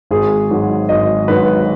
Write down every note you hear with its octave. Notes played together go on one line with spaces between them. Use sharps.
G#1 G#4
G#2 D#3 F#3
G#1 D#5
G#2 D#3 F#3 B4